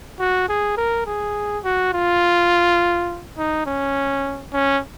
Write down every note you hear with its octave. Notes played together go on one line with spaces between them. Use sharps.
F#4
G#4
A#4
G#4
F#4
F4
D#4
C#4
C#4